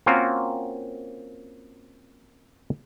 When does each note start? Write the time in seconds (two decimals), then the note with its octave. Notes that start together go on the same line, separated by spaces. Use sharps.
0.06 A#3 C4 C#4 F4 F#4 A#4